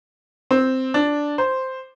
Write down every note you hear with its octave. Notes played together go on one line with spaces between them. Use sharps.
C4
D4
C5